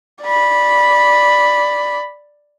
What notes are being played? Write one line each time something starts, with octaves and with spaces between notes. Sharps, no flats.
D5 B5